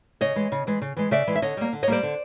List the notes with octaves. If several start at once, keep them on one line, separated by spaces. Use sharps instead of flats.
C#3 C#5 D#5
E3 G#3
C#3
E3 G#3
C#3
E3 G#3
C#3 D5 E5
E3 G#3
E5
D3 C#5 D#5
G3 A#3
D3
C#5 D#5
G3 A#3 C5 D5
D3